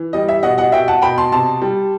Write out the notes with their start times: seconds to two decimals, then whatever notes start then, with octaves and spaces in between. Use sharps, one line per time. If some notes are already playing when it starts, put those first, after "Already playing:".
Already playing: E3
0.13 G3 D#5
0.29 E5
0.43 B2 D#5 F#5
0.58 D#5 F#5
0.72 B2 E5 G5
0.88 F#5 A5
1.02 B2 G5 B5
1.18 A5 C6
1.32 C3 A5 C6
1.62 G3